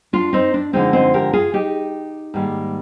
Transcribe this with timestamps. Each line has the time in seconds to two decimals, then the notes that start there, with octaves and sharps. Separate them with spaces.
0.13 D4 F4
0.33 C4 D#4
0.54 D4
0.73 F2 D3 F3 G#3 C4 D#4
0.93 C4 D#4
1.14 G4 A#4
1.33 F4 G#4
1.53 D#4 G4
2.34 G#2 D#3 G3 A#3